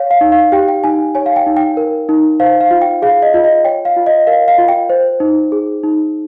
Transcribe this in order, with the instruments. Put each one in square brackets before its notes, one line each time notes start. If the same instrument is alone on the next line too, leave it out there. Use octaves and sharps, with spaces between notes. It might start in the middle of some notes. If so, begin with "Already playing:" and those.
Already playing: [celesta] C#5 F5
F5
D#4
F5
G4 G5
G5
D#4 G#5
C#5 G#5
F5
G5
D#4
G5
A#4
D#4
C5 F5
F5
F4
G5
G#4 F5
D#5
F4
D#5
C#5 G5
F5
F4
D#5
A#4 F5
F5
F4
G5
C5
D#4
G#4
D#4